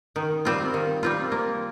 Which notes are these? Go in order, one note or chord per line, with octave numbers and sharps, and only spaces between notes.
D#3
G3 C4 F4
D#3
G3 C4 F4
A#3